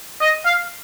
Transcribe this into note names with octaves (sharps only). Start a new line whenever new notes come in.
D#5
F5